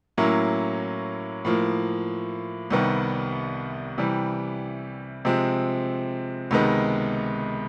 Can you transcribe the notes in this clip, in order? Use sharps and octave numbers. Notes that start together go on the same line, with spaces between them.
A2 F#3 A#3 C#4 E4
A2 F3 A#3
C2 C3 D#3 G3 B3
C3 E3 G3
C3 F3 G#3 C4
C#2 C3 D#3 G#3 B3